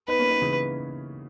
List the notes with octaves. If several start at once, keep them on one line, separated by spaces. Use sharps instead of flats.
B3 D#4 B4
A#3 C#4
B3 D#4
C#3 E3